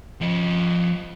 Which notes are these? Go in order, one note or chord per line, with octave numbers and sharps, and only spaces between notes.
F3 D#5